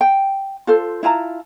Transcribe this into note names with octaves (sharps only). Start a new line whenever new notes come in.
G5
F4 A4 C5
E4 F4 A5 A#5